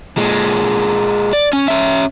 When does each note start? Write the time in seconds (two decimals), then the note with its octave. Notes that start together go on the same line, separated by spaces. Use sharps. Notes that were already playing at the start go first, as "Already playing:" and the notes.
0.17 A#2 G#3
1.33 D5
1.53 C#4
1.68 C#4 E5